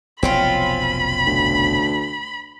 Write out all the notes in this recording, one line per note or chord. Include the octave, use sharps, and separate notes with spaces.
F1 B1 C4 C#4 F4 B5
D2